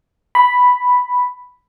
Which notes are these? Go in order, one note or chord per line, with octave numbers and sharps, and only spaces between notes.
B5